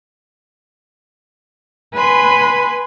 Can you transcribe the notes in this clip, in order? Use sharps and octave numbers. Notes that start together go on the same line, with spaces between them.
B4 G#5 B5 C6